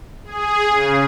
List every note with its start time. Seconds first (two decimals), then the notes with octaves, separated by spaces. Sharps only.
0.24 G#4
0.68 C#3